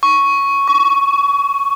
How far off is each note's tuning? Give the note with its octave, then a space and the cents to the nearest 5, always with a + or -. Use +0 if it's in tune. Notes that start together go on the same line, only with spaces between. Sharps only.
C#6 +0
C#6 +30